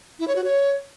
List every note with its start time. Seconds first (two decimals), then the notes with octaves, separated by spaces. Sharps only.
0.19 E4
0.28 C#5
0.36 F#4
0.44 C#5